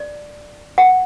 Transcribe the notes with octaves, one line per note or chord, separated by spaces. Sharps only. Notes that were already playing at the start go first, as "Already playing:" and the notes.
Already playing: D5
F#5